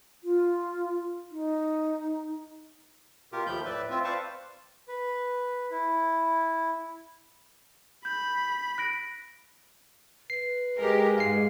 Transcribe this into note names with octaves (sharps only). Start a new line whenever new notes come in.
F4
D#4
B2 F4 G4 A#4
D#2 F3 A3 B5 G6
A2 B4 D5 E5
C4 F4 E5
B4 C5 D5 F5 A5 C#6
B4
E4
B5 G6
F#6 A#6 D7
B4 C7
G#3 G4 A#4
G#2 F5 C7